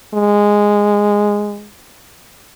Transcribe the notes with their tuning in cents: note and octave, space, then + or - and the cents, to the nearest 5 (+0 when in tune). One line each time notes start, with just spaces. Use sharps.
G#3 -10